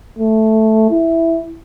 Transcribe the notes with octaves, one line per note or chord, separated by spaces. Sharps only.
A3
E4